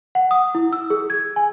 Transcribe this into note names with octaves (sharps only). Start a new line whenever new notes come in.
F#5
D#6
E4
E6
G#4
G#6
G#5